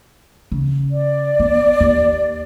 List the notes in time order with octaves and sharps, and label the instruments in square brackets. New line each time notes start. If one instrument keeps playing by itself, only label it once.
[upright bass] C#3
[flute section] D5
[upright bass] B3
D#2